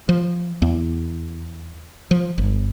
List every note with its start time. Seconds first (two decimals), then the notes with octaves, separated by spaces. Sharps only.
0.09 F3
0.62 E2
2.11 F3
2.38 G1